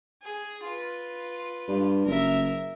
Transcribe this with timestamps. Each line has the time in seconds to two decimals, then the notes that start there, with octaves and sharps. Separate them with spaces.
0.22 G#4
0.64 F4 B4
1.68 G2
2.06 F#1 A#4 E5